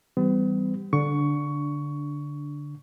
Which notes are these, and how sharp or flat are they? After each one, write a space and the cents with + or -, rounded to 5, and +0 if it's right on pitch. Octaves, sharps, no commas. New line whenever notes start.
E3 +0 G3 +0 B3 +45
D3 -15 D4 +0 C#6 +15